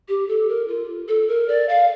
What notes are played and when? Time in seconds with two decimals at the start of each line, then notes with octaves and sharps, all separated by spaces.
0.08 G4
0.28 A4
0.48 A#4
0.68 F4
1.08 A4
1.28 A#4
1.48 D5
1.69 F5